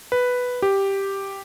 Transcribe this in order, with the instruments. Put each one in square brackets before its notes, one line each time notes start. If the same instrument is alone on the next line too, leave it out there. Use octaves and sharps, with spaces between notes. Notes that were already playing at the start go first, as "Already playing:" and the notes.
[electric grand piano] B4
G4